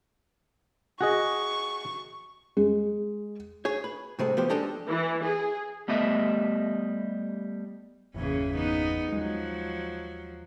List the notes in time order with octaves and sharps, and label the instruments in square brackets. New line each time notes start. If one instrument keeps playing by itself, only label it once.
[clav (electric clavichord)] F#4 G#4 D#5 [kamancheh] C#6
[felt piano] G#3
[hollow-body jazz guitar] G#4 C#5
B4
A2 C3 G#3 A4
F3 B3 G4 C5
G#3 D4 G4 A4 D5 D#5
[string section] E3
G#4
[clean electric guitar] G3 A3 B3 G4 D#5 E5
[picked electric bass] G1 E2 A#2 [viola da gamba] C#3 E3 C#4
[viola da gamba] B3 D#4
[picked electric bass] D#2 G#3 [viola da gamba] F3 F#3